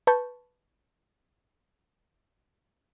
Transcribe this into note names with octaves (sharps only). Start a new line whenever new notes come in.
B4 A5 C#6 G6